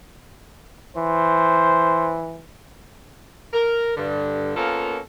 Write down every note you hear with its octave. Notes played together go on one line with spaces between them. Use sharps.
E3 C5
A#4
G2 D3
A#3 B3 C#4 F4 A4 A#4